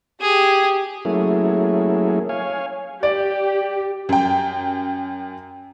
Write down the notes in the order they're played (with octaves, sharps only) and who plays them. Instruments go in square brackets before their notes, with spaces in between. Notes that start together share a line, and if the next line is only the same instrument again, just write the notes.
[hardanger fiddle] G4 [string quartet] G#4
[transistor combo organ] F#3 A3 A#3 C#4 E4 G#4
C#5 F5 G#5
[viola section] G4 [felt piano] D5
[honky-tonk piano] F#2 G5